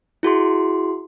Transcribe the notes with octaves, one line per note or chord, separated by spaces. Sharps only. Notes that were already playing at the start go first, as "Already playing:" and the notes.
E4 F#4 G#4 C6